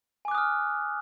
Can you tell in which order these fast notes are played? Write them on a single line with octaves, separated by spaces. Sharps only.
G#5 D6 F#6 D#6 F6